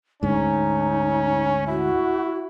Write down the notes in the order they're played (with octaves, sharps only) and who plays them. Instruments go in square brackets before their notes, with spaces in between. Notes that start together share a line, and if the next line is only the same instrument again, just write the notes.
[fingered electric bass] D2 G#2 [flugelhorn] C#4 [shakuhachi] D#4
[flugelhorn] E4 [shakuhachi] F#4